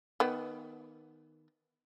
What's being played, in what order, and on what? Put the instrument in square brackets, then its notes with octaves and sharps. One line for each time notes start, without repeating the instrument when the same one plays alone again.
[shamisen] D#3 B3